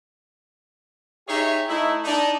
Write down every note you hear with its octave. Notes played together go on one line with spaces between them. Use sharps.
D#4 G4 G#4 C#5 E5
A3 D#4 E4
D4 D#4